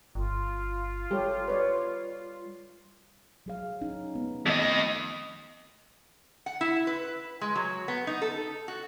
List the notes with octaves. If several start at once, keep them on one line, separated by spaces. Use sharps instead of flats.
G1 F4
G3 G4 A4 C#5
B4 C#5 D5
F#3 G#4 F5
C#4 D#4
B3
F2 D#3 A3 C4 D#5
F#5
E4
B4
G#3
F#3
B3
D#4
A4
F#4